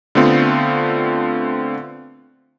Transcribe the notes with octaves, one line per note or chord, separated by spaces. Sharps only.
D3 A3 B3 C4 F4